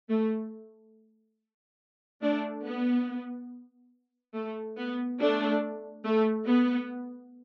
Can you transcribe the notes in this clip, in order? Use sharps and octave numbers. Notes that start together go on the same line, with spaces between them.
A3
A3 D4
B3
A3
B3
A3 D4
A3
B3